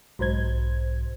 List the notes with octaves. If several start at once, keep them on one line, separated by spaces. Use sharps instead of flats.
B1 G#2 C5 G#6